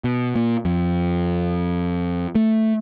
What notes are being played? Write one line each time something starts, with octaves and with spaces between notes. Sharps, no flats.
B2
A#2
F2
A3